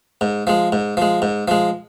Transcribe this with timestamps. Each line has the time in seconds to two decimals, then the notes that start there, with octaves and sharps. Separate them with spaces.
0.21 G#2
0.47 F3 G#3
0.72 G#2
0.97 F3 G#3
1.22 G#2
1.48 F3 G#3